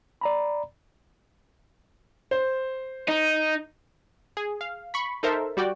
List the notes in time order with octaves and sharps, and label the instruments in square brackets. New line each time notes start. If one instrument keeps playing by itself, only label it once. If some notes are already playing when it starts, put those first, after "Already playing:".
[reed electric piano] D5 A#5 B5
[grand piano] C5
[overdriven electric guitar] D#4
[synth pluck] G#4
F5
B5 C#6
D#4 A4 A#4 C5 E5
G3 F#4 D5 G5